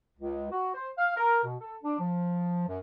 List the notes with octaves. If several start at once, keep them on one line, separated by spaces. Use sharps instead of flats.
C#2
F#4
C5
F5
A#4
B2
A4
D4
F3
F#2